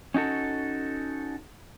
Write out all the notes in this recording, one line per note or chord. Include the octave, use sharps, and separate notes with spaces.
C#4 D#4 F#4 A4